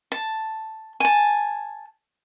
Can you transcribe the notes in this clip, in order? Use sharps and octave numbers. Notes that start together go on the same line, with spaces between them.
A5
G#5 A5